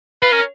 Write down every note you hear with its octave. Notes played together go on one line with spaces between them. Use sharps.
F4 B4
C#4 A#4